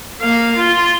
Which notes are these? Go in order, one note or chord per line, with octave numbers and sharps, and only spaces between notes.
A#3 F5
F4